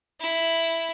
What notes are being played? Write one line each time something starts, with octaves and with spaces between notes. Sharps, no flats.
E4